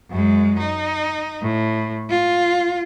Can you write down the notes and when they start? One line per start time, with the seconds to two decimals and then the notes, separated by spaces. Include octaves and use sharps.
0.10 F#2 G#3
0.59 D#4
1.42 A2
2.10 F4